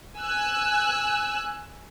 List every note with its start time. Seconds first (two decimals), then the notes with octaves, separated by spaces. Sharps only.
0.17 G#5 E6 F#6